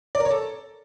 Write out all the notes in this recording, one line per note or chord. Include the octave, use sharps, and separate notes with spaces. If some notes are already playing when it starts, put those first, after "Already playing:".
D5
A#4
C#5
A4